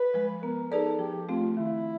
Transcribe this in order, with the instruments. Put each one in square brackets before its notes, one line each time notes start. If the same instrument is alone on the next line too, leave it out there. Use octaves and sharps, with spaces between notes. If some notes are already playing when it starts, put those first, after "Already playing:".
Already playing: [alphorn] B4
[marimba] F3 G#3
[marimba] B3 [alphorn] A#4
[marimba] D#4 G#4 B4 D5 [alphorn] A4
[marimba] F3 [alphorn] G4
[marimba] A3 C4 [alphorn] F4
[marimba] D#3 [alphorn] E4